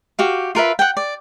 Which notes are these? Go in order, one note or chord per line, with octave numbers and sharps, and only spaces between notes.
F#4 G4 F5
F4 A#4 B4 E5
F#5 G5
D5